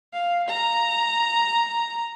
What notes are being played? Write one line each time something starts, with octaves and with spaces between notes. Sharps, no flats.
F5
A#5